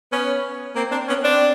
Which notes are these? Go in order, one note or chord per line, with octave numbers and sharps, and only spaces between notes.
B3 C#4
A#3 C4
C4 D4
B3 C#4
C4 D4